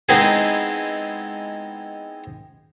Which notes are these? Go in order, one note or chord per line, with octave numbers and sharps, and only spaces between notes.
G#3 B3 C4 D#4 E4 G#4